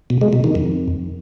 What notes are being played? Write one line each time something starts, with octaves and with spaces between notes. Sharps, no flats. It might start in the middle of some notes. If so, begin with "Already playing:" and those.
B2
G#3
B2
D#3
F2